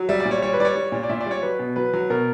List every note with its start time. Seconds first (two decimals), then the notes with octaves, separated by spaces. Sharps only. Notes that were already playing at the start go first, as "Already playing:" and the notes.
Already playing: F#3
0.09 G3 E5
0.20 D5
0.25 A#2
0.31 C#5
0.42 G3 C#5
0.54 B4
0.59 G3 D5
0.65 C#5
0.75 G3
0.92 A#2
1.03 D5
1.09 A#2 E5
1.21 D5
1.26 G3 C#5
1.42 F#3 B4
1.59 B2
1.76 F#3 B4
1.93 F#3
2.10 B2 A#4